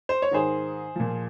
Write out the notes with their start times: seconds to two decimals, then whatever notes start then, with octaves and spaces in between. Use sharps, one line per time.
0.09 C5
0.22 C#5
0.31 G#2 D#3 G#4 C5
0.96 A#2 F3